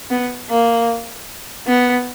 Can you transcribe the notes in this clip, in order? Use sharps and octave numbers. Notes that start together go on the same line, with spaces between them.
B3
A#3
B3